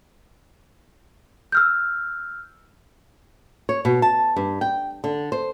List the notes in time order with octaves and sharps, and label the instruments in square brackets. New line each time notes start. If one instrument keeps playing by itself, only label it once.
[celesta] E6 F6 G6
[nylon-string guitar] C#5
B2
A5
G2
G5
D3
C5